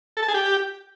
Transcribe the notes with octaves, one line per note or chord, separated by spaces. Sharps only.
A4
A5
G#4
G4